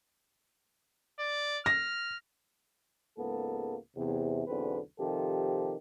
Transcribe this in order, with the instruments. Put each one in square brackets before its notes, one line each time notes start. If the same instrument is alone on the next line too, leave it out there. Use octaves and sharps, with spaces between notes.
[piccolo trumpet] D5
[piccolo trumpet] F6 [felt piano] A#6
[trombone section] C#2 G#2 A#3 B3 A4
E2 C3
B1 E2 D3 C4 B4
C3 D#3 F3 G4 A4